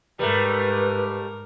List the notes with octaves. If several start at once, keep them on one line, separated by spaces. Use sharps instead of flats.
G#2 G3 A3 A#4 B4